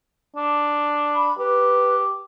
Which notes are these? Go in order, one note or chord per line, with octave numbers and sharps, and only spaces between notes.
D4
B5
G4 B4